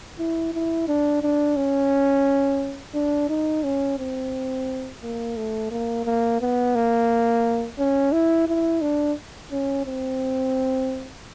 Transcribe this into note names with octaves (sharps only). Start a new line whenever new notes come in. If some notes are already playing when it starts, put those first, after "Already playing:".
E4
E4
D4
D4
C#4
D4
D#4
C#4
C4
A#3
A3
A#3
A#3
B3
A#3
C#4
E4
E4
D4
C#4
C4